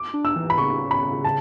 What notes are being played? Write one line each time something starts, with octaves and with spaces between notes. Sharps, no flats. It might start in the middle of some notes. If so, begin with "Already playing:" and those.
Already playing: D6
D4
E6
E3
B5
C#3 C#6
B5
A5